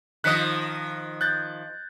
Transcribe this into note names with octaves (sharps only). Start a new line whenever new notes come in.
D#3 F3 D#5 F#6 B6 C#7
F#6 G6 A6